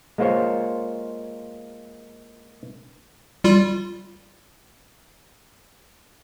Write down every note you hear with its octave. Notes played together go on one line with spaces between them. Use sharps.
G#3 A#3 F4 C5 C#5
G3 F4